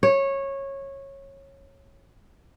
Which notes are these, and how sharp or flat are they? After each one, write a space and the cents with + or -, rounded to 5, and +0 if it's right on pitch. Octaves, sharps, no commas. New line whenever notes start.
C#5 -15